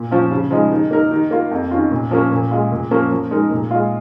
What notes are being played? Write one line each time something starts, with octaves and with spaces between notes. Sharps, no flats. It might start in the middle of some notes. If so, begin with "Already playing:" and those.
Already playing: A#2
F3 C#4 F4
C#3
F3 G#3 D#4
D#3
A#3 D#4 A#4
D#3
A#3 F4
F2
D#3 C#4 F4
A#2
F3 A#3 C#4
A#2
G#3 F4
A#2
F3 A#3 C#4
F3
G#3 D#4 A#4
A#2
G#3 F4